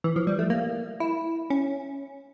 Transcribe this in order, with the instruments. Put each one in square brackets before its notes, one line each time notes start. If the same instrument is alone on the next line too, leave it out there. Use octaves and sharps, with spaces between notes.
[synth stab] E3
F3
G3
A3
A#3
E4
C#4